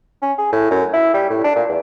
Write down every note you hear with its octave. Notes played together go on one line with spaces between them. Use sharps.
C#4
G#4
A2
F#2
E4
G3
A2
D4
A#2
E2